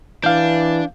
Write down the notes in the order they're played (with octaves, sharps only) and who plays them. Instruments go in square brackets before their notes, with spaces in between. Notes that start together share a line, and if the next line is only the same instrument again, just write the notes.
[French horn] E3 [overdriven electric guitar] D4 [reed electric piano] F5 G6